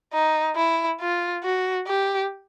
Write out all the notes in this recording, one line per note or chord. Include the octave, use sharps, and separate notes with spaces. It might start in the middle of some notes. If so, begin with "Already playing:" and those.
D#4
E4
F4
F#4
G4